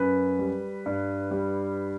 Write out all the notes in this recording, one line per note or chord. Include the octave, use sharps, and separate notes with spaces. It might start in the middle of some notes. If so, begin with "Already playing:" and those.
Already playing: F#2 B4
G3
G2
G3